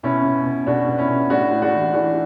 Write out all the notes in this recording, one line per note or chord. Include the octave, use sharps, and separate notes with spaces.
B2 C#4 E4
B2
B2
B2 D4 F#4
B2
C#4 E4
B2
A2 D4 F#4
A2
D4 F#4
E3
E3 D4 F#4